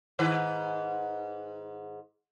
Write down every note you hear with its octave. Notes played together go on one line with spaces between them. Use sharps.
G#2 D#3 B4